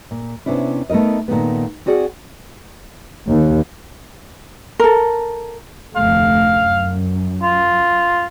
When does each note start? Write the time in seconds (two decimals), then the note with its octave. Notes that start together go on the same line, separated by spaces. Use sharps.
0.11 A#2
0.46 C3 B3 C#4 D4 E4
0.90 A3 B3 D#4 A#4 D#5
1.28 A#2 D#3 A3 B3
1.86 C4 F#4 G#4 D5 F5 F#5
3.28 D#2
4.79 A4 A#4
5.96 F1 D2 A3 F5
6.45 F#2
7.42 F4